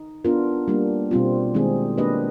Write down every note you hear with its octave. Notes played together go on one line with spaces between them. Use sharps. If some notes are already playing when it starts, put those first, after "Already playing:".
Already playing: D#4
B3 D4 F4 A#4
G3 A#3 D4
B2 G3 C4 F4
D#3 G#3 C4 D#4 G#4
A#3 D4 G4 B4 D#5